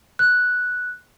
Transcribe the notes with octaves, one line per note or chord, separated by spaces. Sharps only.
F#6